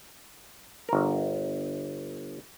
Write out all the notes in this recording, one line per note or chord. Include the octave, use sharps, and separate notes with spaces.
G1 A#4